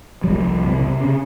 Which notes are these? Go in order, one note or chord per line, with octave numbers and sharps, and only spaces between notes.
F#3
C2 F3 G3
C2
C3
C3
C#3